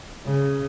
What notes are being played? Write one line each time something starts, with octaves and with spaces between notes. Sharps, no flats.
C#3